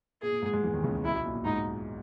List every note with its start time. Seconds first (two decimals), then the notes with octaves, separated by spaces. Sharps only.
0.22 A#2 G#4
0.32 A#2
0.42 G#2 G#3
0.53 G#2 G#3
0.63 E2 E3
0.74 D#2 D#3
0.84 C#2 C#3
1.04 B1 B2 E4
1.14 B1 B2
1.25 A#2
1.35 A#2
1.45 G#2 D#4